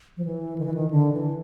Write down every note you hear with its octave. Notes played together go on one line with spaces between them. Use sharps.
F3
E3
D#3
E3
D#3
D3
E3